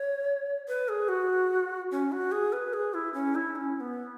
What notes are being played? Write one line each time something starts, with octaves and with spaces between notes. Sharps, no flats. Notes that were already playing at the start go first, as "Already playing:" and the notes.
Already playing: C#5
B4
G#4
F#4
C#4
F#4
G#4
B4
G#4
E4
C#4
E4
C#4
C#4
B3